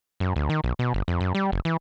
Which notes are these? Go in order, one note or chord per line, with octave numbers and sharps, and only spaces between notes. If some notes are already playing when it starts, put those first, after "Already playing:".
F#2
D2
D#3
B1
B2
G1
F2
F#2
G3
F#1
E3